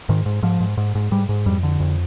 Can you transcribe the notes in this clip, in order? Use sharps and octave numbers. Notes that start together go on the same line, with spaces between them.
G#2 D#3
G#2
G#2 F3
G#2
G#2
G#2
G#2 G3
G#2
F2 G3
D3
F2